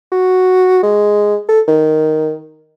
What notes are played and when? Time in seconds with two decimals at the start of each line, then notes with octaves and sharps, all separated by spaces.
0.12 F#4
0.83 G#3
1.49 A4
1.68 D#3